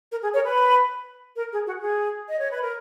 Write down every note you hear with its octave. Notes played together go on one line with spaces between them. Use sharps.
A#4
G#4
A#4 C#5
B4
A#4
G#4
F#4
G#4
D#5
C#5
B4
A#4